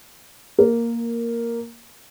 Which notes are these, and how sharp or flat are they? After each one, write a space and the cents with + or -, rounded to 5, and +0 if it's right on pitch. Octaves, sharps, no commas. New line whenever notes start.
A#3 +0 A#4 +0